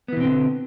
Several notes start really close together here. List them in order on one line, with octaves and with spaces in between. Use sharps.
B3 E3 B2 C4 D3